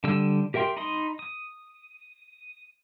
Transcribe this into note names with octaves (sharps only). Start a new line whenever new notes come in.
D3 G3 E6
G4 A#4 E5 G5 C6
D#4 B5 C6 D#6
D#6